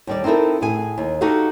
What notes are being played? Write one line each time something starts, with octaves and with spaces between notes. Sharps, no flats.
D#2 G3 D5
C4 D#4 E4 A4 A#4
A2 G#4 G#5
D#2
D#4 F#4 G4 A4 F5